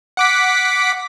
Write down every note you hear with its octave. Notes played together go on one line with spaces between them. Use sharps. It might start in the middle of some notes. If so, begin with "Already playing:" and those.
F#5 D6 B6